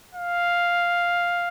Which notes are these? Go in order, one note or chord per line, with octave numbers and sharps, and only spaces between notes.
F5